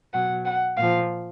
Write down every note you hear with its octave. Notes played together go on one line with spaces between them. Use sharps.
B2 F#3 F#5
F#5
A#2 F3 F5